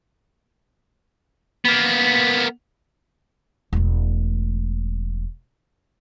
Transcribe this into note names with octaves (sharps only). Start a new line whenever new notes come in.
A#3 B3
E1 A3